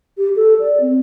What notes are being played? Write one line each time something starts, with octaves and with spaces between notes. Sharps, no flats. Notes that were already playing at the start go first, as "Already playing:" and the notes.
G4
A4
D5
C4